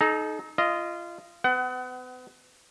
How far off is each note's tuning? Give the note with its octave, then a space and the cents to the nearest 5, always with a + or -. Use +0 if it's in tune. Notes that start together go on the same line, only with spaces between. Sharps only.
D#4 +0 A4 -40 A#5 +0
F4 -25 D#5 +0
B3 +40 F#5 +30